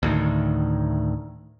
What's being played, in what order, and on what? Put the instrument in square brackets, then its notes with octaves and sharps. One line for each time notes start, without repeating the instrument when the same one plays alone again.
[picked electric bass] D2 A2 D#3